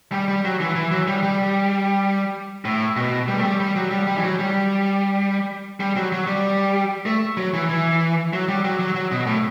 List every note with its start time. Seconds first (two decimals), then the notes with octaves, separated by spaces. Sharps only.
0.12 G3
0.28 G3
0.45 F#3
0.61 E3
0.75 E3
0.91 F#3
1.07 G3
1.23 G3
2.65 A2
2.96 B2
3.28 G3
3.37 A3
3.43 G3
3.60 G3
3.76 F#3
3.91 G3
4.07 G3
4.18 E3
4.23 F#3
4.39 G3
5.80 G3
5.96 F#3
6.12 F#3
6.27 G3
7.06 A3
7.37 F#3
7.53 E3
7.69 E3
8.33 F#3
8.48 G3
8.65 F#3
8.79 F#3
8.95 F#3
9.11 B2
9.27 A2